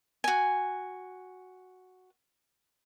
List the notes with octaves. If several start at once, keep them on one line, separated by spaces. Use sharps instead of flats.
F#4 G#5